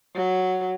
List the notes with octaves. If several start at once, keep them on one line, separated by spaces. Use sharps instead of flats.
F#3